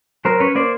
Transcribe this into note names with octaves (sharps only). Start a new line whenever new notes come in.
F#3 A#4 C5
C#4 B4 C#5
A#3 C5 D5